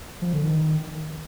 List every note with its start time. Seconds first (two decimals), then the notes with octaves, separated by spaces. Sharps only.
0.22 F3
0.33 D3
0.43 D#3